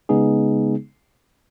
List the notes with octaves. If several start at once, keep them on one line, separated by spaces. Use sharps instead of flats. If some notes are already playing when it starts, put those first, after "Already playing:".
C#3 G#3 B3 D#4 G#4